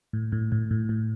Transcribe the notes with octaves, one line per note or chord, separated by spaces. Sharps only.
A2
A2
A2
A2
A2